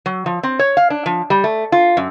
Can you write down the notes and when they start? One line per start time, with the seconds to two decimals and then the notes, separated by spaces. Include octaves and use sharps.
0.06 F#3
0.26 F3
0.43 C4
0.59 C#5
0.77 F5
0.90 D4
1.06 F3
1.30 G3
1.44 A3
1.72 F4
1.97 F#2